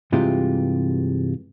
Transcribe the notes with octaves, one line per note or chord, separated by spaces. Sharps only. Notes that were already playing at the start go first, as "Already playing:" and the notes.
G2 C3 E3 G#3 F4 G4